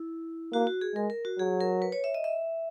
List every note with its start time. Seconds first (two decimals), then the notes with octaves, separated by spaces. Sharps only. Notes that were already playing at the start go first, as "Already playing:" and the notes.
Already playing: E4
0.53 A#3 F#4
0.67 F#4
0.81 G#4
0.95 G#3 A#4
1.10 A#4
1.25 F#4
1.38 F#3 G#4
1.61 A#4
1.82 B4
1.92 C#5
2.04 E5
2.14 D#5
2.24 E5